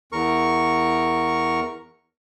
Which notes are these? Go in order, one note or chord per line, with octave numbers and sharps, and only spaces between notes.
E2 A#4 C#6